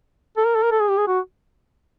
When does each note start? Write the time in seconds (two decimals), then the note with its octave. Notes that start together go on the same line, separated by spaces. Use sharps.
0.37 A4
0.46 A#4
0.55 A4
0.63 A#4
0.72 A4
0.80 G#4
0.89 G4
0.97 G#4
1.07 F#4